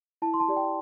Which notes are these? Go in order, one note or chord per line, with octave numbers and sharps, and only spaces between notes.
E4 A5
C6
A5
G4 D5
G5